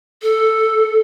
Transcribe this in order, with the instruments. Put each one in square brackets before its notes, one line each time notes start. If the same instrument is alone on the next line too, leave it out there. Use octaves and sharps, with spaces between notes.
[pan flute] A4